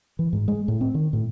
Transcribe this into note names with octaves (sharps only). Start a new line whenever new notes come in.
E3
G#2
G#3
A2
C4
D#3
A2